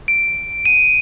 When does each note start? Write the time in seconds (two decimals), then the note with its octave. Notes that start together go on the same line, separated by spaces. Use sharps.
0.08 D7
0.66 D#7